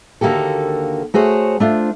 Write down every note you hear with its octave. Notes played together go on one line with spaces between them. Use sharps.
D#2 D3 A#3 F#4 G4 A4
A3 F#4 G#4 C5 C#5
A3 D4 F4 C5